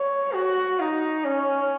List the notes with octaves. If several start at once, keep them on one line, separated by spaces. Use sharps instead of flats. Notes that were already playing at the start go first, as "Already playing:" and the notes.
Already playing: C#5
F#4
D#4
C#4